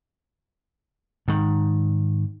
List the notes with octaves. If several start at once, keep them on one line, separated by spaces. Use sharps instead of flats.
G#2 D#3